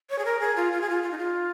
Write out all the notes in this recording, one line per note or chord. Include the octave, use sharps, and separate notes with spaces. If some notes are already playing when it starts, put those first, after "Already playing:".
C#5
G#4
A#4
G#4
F4
F4
G#4
F4
F4
D#4
F4